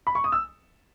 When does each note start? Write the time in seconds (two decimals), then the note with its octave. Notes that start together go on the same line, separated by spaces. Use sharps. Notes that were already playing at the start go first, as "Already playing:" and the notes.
0.07 B5
0.15 C#6
0.24 D#6
0.32 E6